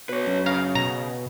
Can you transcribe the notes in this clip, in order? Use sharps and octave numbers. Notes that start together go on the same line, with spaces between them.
B2 B4 C#5
F#2
C#3 F5 A#5
B2 A#5